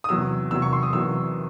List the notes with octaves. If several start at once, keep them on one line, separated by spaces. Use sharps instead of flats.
D#6
E2 C3 F#3 E6
E2 C3 F#3 E6
C#6
C6
D#6
E2 C3 F#3 E6